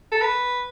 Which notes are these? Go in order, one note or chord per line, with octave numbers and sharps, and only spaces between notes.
A4
B4